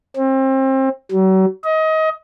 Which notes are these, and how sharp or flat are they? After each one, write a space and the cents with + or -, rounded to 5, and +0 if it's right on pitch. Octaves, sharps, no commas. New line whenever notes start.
C4 +30
F#3 +40
D#5 +25